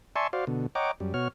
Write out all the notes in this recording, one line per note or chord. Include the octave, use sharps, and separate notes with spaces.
D5 E5 G#5 A5 C6 C#6
F#4 C5 D5 F5
B2 D3
C#5 D#5 F#5 G5 A#5 D6
F#2 G3
B2 F#4 C#5 F6